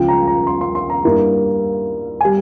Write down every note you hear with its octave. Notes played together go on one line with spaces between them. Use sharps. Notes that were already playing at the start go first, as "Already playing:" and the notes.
Already playing: C#2 C#3 F3 G5
A#5
A#5
C6
C6
C6
A#5
G2 G3 A#3 E4
G3 G#5